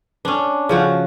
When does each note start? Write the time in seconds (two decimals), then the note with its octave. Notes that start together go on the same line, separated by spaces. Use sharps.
0.25 C#4 D4
0.69 C#3 F3 F#4